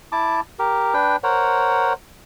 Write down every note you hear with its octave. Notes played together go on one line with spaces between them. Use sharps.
E4 A5 D6
G4 A#4
D4 B4 G5
A#4 C5 C#5 F#5